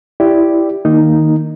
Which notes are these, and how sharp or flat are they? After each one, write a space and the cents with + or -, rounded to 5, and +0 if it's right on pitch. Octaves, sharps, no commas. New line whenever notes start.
E4 +10 G4 +0 D5 +0
D#3 +0 A#3 -10 D#4 +0